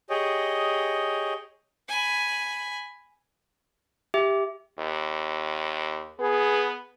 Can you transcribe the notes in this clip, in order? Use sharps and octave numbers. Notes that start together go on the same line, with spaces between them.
G4 G#4 C#5 D#5
G#5 B5
G4 E5
D#2
B3 G#4 B4